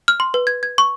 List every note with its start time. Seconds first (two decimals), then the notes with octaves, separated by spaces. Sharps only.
0.08 F6
0.20 C6
0.34 B4
0.47 G#6
0.63 G#6
0.78 C#6